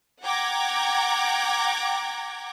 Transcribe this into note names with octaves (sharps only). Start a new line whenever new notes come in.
F#5 G5 A#5 D6 G#6